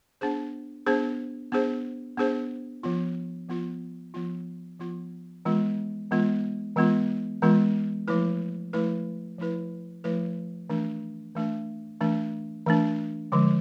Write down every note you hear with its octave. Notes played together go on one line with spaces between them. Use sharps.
B3 D4 G#4 C5
B3 D4 G#4 C5
B3 D4 G#4 C5
B3 D4 G#4 C5
F3 B3 F4
F3 B3 F4
F3 B3 F4
F3 B3 F4
E3 G#3 B3 F4
E3 G#3 B3 F4
E3 G#3 B3 F4
E3 G#3 B3 F4
F3 A3 E4 B4
F3 A3 E4 B4
F3 A3 E4 B4
F3 A3 E4 B4
E3 A3 D4
E3 A3 D4
E3 A3 D4
E3 A3 D4
D3 F3 G#3